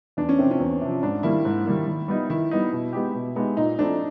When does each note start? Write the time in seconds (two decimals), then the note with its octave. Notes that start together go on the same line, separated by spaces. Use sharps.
0.17 E2 D4
0.29 C#4
0.39 C3 F3 C4
0.51 C#4
0.60 E2
0.81 C3 F3
1.03 G#2 D4
1.23 D#3 G3 A#3 E4
1.45 G#2
1.66 D#3 G3 A#3
1.87 D#3
2.08 G3 B3 D#4
2.30 D#3 E4
2.51 G3 B3 D#4
2.72 B2
2.93 G#3 B3 D#4 G4
3.14 B2
3.36 G#3 B3 D#4 G4
3.57 A#2 D#4
3.78 F3 A3 C4 D4 E4